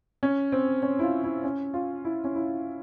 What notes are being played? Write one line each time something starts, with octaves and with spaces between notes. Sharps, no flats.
C#4
C4
C#4
E4
F4
E4
C#4
F4
E4
C#4
E4